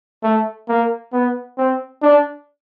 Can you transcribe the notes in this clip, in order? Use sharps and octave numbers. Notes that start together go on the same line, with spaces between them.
A3
A#3
B3
C4
D4